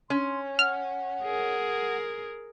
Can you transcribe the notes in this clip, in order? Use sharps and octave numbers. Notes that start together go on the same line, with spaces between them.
C#4 C6
F#5 F6
G#4 A#4